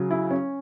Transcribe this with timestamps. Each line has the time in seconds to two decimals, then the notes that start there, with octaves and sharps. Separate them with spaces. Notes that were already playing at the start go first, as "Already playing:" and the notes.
Already playing: C#3 F#3
0.11 E4
0.31 C#4